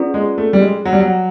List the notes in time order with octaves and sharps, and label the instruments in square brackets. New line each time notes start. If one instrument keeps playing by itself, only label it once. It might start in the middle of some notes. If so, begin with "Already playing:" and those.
Already playing: [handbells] C#4 F4 G#4 B4 D5
[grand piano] G#3
A3
G3
G#3
F#3
G3
F#3